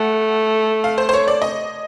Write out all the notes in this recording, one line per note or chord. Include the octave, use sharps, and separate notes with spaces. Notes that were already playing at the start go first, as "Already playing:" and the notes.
Already playing: A3 F#5
F5
C5
C5
C#5
D5
D#5